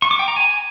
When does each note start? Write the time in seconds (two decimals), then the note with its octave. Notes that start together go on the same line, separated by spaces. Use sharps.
0.02 C#6
0.11 D6
0.19 G5
0.28 A#5
0.36 G#5